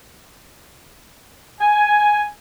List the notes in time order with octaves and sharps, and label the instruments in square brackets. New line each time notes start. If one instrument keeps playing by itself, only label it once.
[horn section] G#5